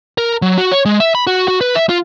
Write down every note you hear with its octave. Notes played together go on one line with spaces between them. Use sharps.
A#4
F#3
F#4
C#5
G#3
E5
B5
F#4
F#4
B4
E5
F4